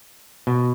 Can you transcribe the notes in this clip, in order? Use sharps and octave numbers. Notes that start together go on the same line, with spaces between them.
B2